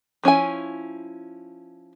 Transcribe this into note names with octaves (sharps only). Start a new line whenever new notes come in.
F3 C#4 E4 G#5